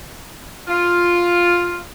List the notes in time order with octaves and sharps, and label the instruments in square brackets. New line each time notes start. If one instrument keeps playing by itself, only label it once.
[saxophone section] F4